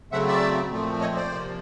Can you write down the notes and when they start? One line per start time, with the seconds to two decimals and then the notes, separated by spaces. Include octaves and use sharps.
0.12 C#3 F#3 A3 C4 E5 F#5
0.27 D5 E5
0.71 A#2 F3 A3 C4
1.00 C#5 D#5
1.15 C5 D5
1.30 C3 F3 A#3